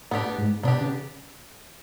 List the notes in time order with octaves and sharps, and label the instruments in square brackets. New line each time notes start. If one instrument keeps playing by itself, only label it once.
[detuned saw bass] A2 [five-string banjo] B3 D4 G4
[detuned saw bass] G#2
[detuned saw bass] B2 [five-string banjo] B3 D4 G4
[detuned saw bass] C#3